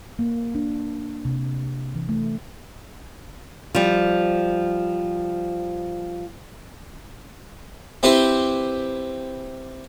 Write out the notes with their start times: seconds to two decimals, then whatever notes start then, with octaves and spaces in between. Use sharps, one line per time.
0.19 A#3
0.55 D4
1.25 C3
1.95 E3
2.09 A3
3.75 F3 G3
8.03 C4 E4 G4 B4 C5